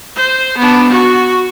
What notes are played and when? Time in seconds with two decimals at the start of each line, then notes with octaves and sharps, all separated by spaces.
0.16 C5
0.58 B3 D4
0.90 F#4